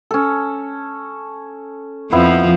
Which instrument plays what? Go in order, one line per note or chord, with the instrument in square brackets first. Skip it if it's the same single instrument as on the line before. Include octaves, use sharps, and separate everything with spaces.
[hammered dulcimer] C#4 A4
[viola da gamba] F2 F3 [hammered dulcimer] B3 E4